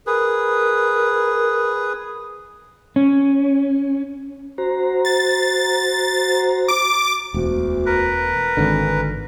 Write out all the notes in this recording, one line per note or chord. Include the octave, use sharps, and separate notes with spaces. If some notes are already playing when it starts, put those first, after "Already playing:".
G#4 A#4 B4
C#4
F#4 C5 A#5
A6
D6
E1 D2
A#4 B4
G#1 D3 E3